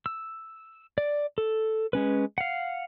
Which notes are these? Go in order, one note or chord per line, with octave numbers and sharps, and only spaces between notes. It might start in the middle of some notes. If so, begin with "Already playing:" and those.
E6
D5
A4
G#3 C#4 B4
F5 F#5